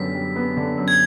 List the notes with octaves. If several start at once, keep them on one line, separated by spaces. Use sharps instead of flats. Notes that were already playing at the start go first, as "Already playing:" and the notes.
Already playing: F#2 D3 G3 B3 B6
G3
B3
D3
F#2
G#6